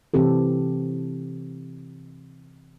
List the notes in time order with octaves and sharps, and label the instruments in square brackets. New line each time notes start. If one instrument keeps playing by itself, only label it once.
[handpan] C3 E3 C4 G4 A4